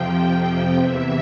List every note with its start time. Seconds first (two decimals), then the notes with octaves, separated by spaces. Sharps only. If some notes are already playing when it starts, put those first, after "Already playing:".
Already playing: F2 C3 F3 G5
0.78 E2 C3 E3 E5